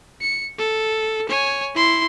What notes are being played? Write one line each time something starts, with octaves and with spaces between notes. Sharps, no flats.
C#7
A4
C#5 G#5
E4 C6